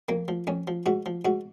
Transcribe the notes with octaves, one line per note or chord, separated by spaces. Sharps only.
F2 A#3
F3
F2 C#4
F3
G#2 F#4
F3
G#2 F#4